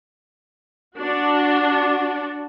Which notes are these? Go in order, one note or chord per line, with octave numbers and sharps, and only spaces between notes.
D4 F#4